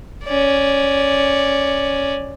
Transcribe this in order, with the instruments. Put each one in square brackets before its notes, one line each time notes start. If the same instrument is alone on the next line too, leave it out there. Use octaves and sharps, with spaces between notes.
[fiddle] C#4 D5